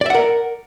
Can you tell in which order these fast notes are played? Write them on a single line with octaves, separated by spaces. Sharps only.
D5 E5 F#5 A#4